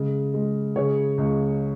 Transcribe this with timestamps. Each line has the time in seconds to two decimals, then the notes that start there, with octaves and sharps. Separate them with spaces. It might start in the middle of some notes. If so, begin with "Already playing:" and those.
Already playing: C#3 G#3
0.34 G#3
0.76 C#3 G#4 C#5
1.18 C#2